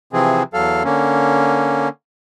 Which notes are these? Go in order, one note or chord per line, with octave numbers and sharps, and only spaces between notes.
C3 E3 F3 C4 G#4
E2 F#3 A4 F5
D3 A#3 C#4